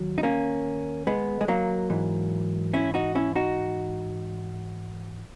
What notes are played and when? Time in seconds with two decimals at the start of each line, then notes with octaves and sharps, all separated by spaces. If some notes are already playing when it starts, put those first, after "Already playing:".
Already playing: D#2 D#3 F#3
0.18 D#4
0.23 A#3 C#4
1.07 G#3 B3
1.41 G#3
1.48 F#3 A#3
1.90 G#2 E3
2.73 C#4 E4
2.94 D#4 F#4
3.15 C#4 E4
3.35 D#4 F#4